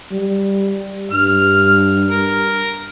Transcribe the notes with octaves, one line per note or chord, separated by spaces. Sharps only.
G3
G2 F6
A#4